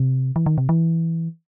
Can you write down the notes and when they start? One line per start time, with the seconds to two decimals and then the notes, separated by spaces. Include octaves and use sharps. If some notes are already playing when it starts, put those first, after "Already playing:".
Already playing: C3
0.36 E3
0.46 D#3
0.58 C3
0.69 E3